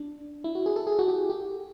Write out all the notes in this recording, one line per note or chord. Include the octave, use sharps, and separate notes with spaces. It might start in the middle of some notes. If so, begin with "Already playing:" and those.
Already playing: D4
E4
F#4
G#4
A4
G#4
F#4
G4
G4